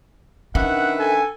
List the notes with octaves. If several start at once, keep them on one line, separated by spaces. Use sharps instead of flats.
D#3 C#4 D4 B4 E5 F#5
A4 G#5